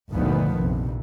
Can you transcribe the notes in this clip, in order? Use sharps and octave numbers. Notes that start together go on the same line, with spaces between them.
G1 D2 A#2 D#3 F3 B3
A#1 F2 C3